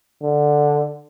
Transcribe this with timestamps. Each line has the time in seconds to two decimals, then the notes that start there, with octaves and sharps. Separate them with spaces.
0.23 D3